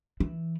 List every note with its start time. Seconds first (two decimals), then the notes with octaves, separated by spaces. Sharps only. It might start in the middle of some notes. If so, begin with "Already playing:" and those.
0.20 E3